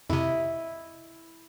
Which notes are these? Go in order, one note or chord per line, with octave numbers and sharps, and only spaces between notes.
F2 C3 E4 D#5